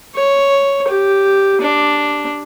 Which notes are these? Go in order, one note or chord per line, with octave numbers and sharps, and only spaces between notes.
C#5
G4
D4